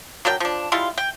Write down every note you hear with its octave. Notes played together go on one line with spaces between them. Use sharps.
F#3 D4 A#4 G5
F3 D4
G3 G#3 E4 F4
G5